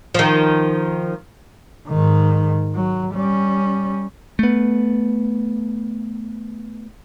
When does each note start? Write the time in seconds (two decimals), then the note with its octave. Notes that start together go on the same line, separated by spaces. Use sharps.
0.14 D#3 F3
1.88 G#2 D#3
2.75 F#3
3.14 G3 C#4
4.39 A3 B3